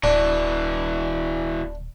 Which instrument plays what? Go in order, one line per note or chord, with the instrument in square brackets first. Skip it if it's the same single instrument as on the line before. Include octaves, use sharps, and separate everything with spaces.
[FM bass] D1 [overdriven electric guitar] B2 E3 [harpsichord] D4